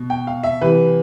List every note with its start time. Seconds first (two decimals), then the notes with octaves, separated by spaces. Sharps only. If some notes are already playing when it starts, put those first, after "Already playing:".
Already playing: B2
0.10 G5
0.27 F5
0.43 E5
0.61 C2 C3 E3 B4